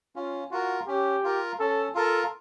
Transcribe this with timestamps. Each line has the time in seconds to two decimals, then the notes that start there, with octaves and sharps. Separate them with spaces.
0.15 C#4 F4
0.51 F4 F#4 A#4
0.87 C#4 G4
1.24 F4 A#4
1.59 C#4 A4
1.94 F4 A4 A#4